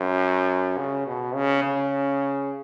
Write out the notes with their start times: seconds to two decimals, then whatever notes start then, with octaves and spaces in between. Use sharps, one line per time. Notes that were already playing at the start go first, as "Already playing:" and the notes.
Already playing: F#2
0.78 C#3
1.06 B2
1.35 C#3
1.63 C#3